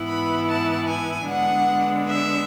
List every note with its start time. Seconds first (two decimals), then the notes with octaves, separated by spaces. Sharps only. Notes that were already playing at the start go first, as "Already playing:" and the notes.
Already playing: G#2 E3 B3 E4
0.09 B5
0.49 A5
0.88 G#5
1.28 D3 G#3 B3 D4 F#5
2.09 E5